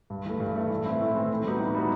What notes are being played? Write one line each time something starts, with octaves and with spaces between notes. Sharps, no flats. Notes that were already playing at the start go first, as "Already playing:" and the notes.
G2
E3 A3
G2
E3 A3
A2
E3 A3 C4 E4
A2
E3 A3 C4 E4
A2
G3 B3 D#4 F#4
A2
G3 B3 D#4 F#4